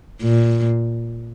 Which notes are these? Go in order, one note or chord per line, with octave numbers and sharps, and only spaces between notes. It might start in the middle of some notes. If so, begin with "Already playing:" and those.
A#2